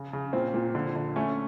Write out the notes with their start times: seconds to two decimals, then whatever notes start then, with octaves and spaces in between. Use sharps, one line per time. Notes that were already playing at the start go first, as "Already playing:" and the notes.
Already playing: C#3
0.13 C#3
0.33 A#2 C4
0.54 A#2
0.75 D3
0.96 D3
1.16 A3 C#4